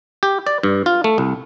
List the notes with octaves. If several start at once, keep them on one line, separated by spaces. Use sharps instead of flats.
G4
D5
G2
F4
A3
C2